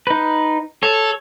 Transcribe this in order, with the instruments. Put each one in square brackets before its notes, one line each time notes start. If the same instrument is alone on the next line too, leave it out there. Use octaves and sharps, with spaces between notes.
[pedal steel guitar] D#4 B4
[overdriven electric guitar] A4 [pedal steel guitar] C#5